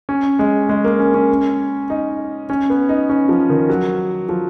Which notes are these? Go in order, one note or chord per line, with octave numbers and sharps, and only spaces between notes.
C#4
G#3
G#3
A#3
C#4
C#4
D#4
C#4
B3
D#4
C#4
F3
D#3
F#3
F3